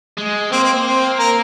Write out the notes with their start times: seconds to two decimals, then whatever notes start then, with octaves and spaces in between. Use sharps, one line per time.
0.18 G#3
0.52 A#3 C4
0.63 C4
0.86 C4
1.19 A#4